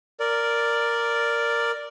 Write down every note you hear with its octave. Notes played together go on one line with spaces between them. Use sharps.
A#4 D5